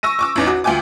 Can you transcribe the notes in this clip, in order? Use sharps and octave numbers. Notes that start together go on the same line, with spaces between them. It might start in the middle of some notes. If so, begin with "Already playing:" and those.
C#6 E6 A#6 D#7
C#6 D6 E6
A1 E2 D#4
F#4
D2 F4 G5 G#5 D6